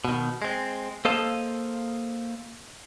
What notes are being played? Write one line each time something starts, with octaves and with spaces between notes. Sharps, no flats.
B2 D#3
G#3 C4
A#3 A4 C5 D#5 F5 A5